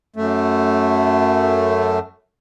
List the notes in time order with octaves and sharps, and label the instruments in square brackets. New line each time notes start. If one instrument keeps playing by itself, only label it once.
[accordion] F#2 A3